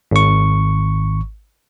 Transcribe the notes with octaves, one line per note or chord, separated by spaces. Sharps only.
G#1 C#6